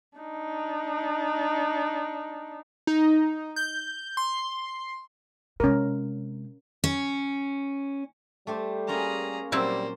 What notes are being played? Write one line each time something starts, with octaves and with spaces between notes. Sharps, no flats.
D4 D#4
D#4
G6
C6
C3 G#3 C#4 A#4
C#4
G3 A3 G4 C5
A#3 C#4 F4 G#4 A#5
A#2 F#3 G3 A#3 C4 E4 C5